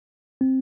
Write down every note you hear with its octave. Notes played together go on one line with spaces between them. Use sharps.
C4